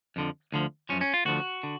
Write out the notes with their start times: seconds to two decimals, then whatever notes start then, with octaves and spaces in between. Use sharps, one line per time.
0.16 F2 D3 F3
0.52 D2 D3 F3
0.89 F#2 F3 C#4
1.01 C#4
1.14 F4
1.25 D2 D3 F3 F#4
1.63 D3